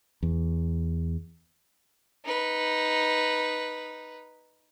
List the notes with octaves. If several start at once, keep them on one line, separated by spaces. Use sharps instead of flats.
E2
D#4 B4